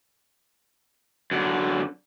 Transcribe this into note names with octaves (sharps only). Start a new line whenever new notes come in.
F#2 D3